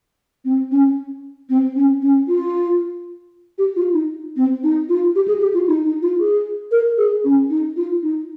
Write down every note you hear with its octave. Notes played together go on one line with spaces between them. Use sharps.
C4
C#4
C4
C#4
C#4
F4
G4
F4
D#4
C4
D#4
F4
G4
G#4
G4
F4
D#4
D#4
F4
G#4
A#4
G#4
C#4
D#4
F4
D#4